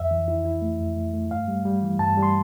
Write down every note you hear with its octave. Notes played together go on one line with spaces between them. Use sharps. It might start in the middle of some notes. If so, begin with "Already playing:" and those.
Already playing: F2 E5
E3
E4
E4
A3
F2
A3
A3
G2 F5
G3
G3
E3
G2 A5
G3
C6